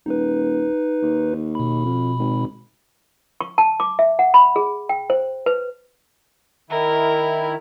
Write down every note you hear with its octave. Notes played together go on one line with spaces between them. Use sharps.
D#1 D#4 B4
D#2
B2 B5
F2
G#1
C#6
A5
D6
E5
F#5
B5
G#4
G5
C5
B4
D#3 E4 A#4